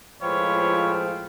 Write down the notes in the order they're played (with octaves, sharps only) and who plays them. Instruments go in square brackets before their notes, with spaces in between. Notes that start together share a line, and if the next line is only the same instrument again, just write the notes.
[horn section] A2 F3 G#3 C4 F4 B4 C#5